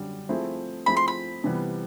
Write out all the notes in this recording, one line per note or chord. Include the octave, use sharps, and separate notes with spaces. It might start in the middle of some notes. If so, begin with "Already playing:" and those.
Already playing: F#2 D3 G3
F3 A3 C4 E4 G#4
F3 A3 C4 E4 G#4 B5
C6
B5
C3 E3 G3 B3